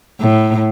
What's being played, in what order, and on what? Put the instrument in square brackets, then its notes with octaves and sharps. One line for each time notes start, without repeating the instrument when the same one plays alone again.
[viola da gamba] A2